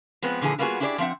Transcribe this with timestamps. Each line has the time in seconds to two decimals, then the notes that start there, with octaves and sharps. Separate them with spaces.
0.22 F3 G#3 B3 C4
0.41 A#2 D3 E3 F3 G#4
0.59 G3 A#3 B3 F4 F#4 G#4
0.80 D4 E4 G4 G#4 C5 D5
0.98 F3 A3 C4 E5 F#5